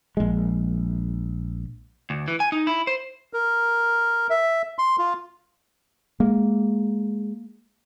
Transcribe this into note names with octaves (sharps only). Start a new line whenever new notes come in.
A#1 G#3
D2
E3
G#5
D#4
E4
C5
A#4
E5
C6
F4
G#3 A#3